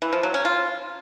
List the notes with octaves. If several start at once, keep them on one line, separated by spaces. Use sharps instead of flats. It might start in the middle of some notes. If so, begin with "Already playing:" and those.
E3
F3
F#3
C#4
F4